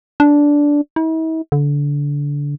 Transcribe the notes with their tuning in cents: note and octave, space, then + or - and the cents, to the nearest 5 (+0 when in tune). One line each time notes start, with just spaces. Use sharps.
D4 -10
E4 -45
D3 -25